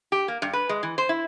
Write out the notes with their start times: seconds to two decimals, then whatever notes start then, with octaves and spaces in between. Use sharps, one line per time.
0.12 G4
0.28 A#3
0.42 G2
0.53 B4
0.69 G#3
0.83 E3
0.98 C5
1.09 E4